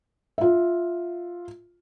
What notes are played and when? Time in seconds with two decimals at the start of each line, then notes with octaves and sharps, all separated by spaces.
0.38 F4 E5